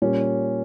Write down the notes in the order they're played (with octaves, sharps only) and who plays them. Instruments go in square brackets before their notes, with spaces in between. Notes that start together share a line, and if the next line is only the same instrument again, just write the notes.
[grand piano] A#2 G3 C#4